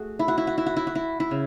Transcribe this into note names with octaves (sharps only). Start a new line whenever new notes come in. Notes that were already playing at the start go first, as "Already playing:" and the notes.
Already playing: A3 F#4 G#4
E4
F#4
E4
F#4
E4
F#4
E4
F#4
E4
E4
C#3